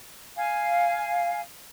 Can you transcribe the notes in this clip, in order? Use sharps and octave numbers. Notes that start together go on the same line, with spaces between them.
F5 G#5